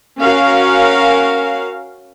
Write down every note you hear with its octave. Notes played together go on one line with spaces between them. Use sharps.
C#4 F#4 A#4 F5